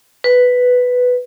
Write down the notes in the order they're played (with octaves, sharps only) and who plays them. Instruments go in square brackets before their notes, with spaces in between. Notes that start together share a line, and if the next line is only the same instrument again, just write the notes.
[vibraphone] B4